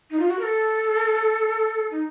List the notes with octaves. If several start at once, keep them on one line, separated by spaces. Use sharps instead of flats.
D#4
F4
F#4
A#4
A4
D#4